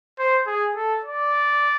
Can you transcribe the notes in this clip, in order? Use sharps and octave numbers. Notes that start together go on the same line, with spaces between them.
C5
G#4
A4
D5